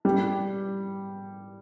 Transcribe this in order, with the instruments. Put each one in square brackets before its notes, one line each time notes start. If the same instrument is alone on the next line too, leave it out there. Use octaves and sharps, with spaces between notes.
[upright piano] G3